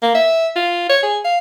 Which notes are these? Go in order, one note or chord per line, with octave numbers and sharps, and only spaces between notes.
A#3
E5
F4
C#5
G#4
F5